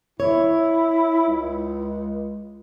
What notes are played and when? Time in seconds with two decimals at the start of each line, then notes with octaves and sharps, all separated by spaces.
0.20 E4 C#5
1.28 C#2